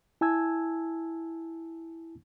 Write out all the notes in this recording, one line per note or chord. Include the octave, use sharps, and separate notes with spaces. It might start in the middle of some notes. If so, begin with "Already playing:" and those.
E4 G#5 A5 E6 G#6